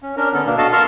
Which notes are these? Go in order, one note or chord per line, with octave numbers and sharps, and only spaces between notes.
C#4
C#4 D4 A#4
D3 B3 A4
B2 A#3 D4
F#4 A4 D#5 F5 A5
A#4 A5 C6 C#6 E6 F6